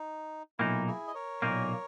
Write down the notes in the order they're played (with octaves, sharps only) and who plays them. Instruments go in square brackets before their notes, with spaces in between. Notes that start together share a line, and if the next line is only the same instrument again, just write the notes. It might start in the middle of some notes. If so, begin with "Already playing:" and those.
Already playing: [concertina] D#4
[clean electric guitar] B1 A#2 A#3 D#4 [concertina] E4
[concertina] E4 G#4
D#5
A#4 C#5
[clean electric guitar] B1 A#2 A#3 D#4